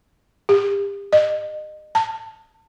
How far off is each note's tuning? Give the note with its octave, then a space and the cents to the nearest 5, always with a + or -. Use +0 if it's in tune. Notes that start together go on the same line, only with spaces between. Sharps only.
G4 +35
D#5 -30
A5 +30